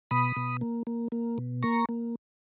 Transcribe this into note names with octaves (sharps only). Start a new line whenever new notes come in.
B2 B5 D#6
B2
A#3
A#3
A#3
B2
A#3 A#5 C#6
A#3